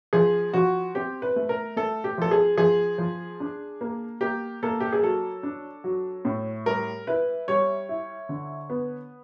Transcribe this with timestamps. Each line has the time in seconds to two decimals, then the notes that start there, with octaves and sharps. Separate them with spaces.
0.13 F3 G#4
0.54 F3 F#4
0.95 C4 G4
1.22 B4
1.36 A3
1.49 A#4
1.76 A3 A4
2.04 G4
2.18 F3 A4
2.31 G#4
2.58 F3 G#4
2.98 F3
3.40 D4
3.81 A#3
4.21 A#3 G4
4.63 A#3 A4
4.80 G4
4.93 G#4
5.03 F#3 A4
5.43 D4
5.84 F#3
6.25 A2
6.66 G3 A#4
7.07 E4 B4
7.48 G3 C#5
7.89 E4
8.29 D3
8.70 B3